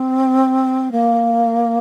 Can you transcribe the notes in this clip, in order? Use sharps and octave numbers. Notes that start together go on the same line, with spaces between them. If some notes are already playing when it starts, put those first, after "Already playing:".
Already playing: C4
A#3